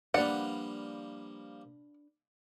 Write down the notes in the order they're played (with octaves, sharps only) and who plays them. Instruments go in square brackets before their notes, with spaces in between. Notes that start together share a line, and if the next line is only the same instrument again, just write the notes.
[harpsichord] F3 G3 A#3 [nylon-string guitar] D4 B4 [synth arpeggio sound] D5 [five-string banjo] F#5